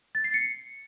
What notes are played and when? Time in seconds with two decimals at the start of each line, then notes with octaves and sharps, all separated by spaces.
0.15 A6
0.24 C7
0.34 C#7